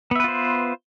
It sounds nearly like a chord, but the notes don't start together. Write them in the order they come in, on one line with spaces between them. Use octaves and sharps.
B3 E5 B4 F4 C5